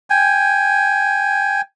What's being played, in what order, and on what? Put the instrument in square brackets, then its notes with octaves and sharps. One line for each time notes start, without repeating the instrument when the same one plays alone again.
[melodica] G5 G#5